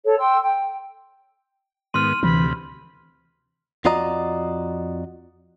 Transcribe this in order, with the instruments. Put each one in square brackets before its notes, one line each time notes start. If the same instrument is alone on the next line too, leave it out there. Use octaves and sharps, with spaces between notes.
[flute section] A4 C#5
G5 C6 E6
G5
[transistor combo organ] G#2 D#3 B3 [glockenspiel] C6 F6 [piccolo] D#7
[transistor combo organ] D2 C3 [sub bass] E3 [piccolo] B5
[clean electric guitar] F2 F4 F#4 D5 D#5 A#5